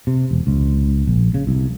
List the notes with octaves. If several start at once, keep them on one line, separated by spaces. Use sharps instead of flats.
C3
E1
C#2
A#1
C#3
C2